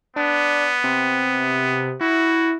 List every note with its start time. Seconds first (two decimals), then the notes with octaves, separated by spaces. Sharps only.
0.16 B3 D4
0.84 C3
2.01 E4 F#4